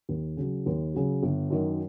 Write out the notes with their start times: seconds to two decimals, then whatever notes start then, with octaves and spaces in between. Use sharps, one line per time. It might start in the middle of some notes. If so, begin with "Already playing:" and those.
0.09 D#2
0.37 C#3 F#3
0.66 D#2
0.94 C#3 F#3
1.23 G1
1.50 F#2 D#3 F#3